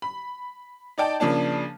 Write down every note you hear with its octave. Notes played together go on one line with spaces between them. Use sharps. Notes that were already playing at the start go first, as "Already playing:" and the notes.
B5
D#4 D5 G5 A5
C#3 F3 A#3 D4 A5